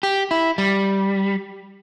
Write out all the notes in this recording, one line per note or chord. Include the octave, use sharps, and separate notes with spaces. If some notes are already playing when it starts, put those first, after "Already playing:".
G4
E4
G3